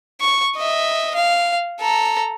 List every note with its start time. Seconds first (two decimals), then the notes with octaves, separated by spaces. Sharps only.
0.21 C#6
0.57 D#5 E5
1.14 F5
1.81 A4 A#5